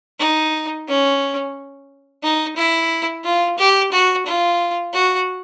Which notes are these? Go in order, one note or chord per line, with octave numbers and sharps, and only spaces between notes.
D#4
C#4
D#4
E4
F4
G4
F#4
F4
F#4